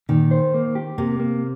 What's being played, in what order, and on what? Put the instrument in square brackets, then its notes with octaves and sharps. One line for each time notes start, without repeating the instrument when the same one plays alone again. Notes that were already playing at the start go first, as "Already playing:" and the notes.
[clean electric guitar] A#2 [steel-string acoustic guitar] D#3
[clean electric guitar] C5
A#3
G4
[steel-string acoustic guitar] C3 [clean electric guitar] A#3
[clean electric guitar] A#3